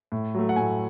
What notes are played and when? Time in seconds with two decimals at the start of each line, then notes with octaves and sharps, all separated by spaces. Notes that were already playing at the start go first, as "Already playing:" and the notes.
0.12 A2
0.35 F#3 A3
0.49 F#5
0.56 A2 G#5